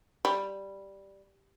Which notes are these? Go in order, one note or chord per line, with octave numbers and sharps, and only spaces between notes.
G3